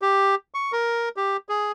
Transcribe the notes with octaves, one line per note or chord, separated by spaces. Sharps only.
G4
C#6
A#4
G4
G#4